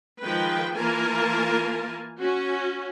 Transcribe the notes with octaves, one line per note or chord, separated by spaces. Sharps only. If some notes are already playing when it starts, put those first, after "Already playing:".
D#3 F3 G#3 B4 G5
E3 A#3 F4 A#4 G#5 A5
C#4 F#4